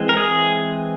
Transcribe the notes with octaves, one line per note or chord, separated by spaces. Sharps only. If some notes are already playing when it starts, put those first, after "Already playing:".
Already playing: E3 G#3 C4
A#4
G#4